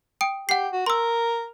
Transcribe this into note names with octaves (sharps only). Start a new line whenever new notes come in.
G5 D#6 D7
G4 F#5 C7
F#4
A#4 C6 E6